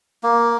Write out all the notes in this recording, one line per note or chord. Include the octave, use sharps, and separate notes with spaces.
A#3